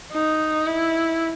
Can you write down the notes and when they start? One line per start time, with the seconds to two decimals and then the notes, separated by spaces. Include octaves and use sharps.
0.13 D#4
0.66 E4